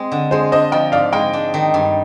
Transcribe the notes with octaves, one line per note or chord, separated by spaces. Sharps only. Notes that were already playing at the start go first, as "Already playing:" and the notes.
Already playing: G#3 C4
D3
G#3 G#4 C5
D4 C5 D#5
F3 D#5 G5
G#2 D5 F5
G#3 D#5 G5
D4
D#3
G2